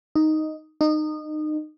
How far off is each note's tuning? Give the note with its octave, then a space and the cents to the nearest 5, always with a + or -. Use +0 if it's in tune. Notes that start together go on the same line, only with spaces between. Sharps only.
D#4 +0
D#4 -25